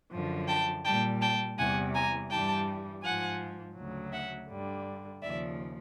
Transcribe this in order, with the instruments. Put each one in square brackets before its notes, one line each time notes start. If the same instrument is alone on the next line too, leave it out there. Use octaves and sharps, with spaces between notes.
[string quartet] F#2 D3 F3
G5 A5
A#2 G3 G5 A5
G5 A5
E2 C3 E3 G3 F#5 G#5
G#5 A#5
G2 E3 G3 G5 A5
G#2 F3 F#5 G#5
D2 C#3 F#3
E5 F#5
G2 D3 G3
D#2 C#3 F3 D5 E5